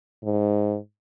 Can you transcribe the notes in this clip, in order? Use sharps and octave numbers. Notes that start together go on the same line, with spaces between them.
G#2